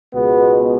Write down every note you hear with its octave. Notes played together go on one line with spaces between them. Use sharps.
C#2 B2 G#3 B3